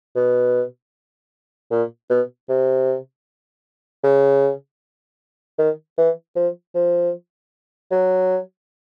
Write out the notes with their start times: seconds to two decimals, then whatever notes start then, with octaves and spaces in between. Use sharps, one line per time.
0.16 B2
1.71 A#2
2.10 B2
2.49 C3
4.04 C#3
5.59 D#3
5.98 E3
6.36 F3
6.75 F3
7.91 F#3